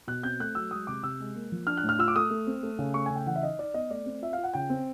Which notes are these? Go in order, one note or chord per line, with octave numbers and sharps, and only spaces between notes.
B2 F#6
C4 G6
A3 F#6
F#3 E6
G#3 D#6
C3 D6
C3 E6
G#3
A#3
F3
D4 F6
F#6
A2
F6
F4 E6
D6
A3 D#6
A3
C4
A3
C#3
A3 C#6
C#3 G#5
G5
E3 F#5
E5
D#4 D#5
D#4 D5
B3 D#5
A3 D5
C4
F4 E5
F5
F4
F#5
C#3 G5
C4